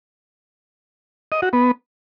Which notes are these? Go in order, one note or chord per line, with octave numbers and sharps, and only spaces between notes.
D#5
F#4
B3